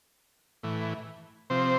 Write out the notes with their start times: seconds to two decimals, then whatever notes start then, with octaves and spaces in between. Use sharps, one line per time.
0.63 A2 E3
1.50 C3 F3 C4 C5